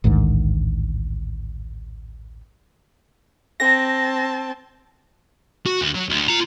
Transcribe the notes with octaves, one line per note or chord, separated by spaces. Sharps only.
A1 D2 G#2 D#3
C4 A5 A#6
F#4
D2
F#3
D2
F4 A#5